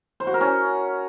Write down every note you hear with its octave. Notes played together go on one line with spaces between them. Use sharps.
C5
F#4
A#4
C#4